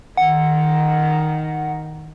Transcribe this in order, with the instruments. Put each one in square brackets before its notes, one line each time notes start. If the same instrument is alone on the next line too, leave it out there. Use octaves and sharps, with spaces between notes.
[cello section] D#3 [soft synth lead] F#5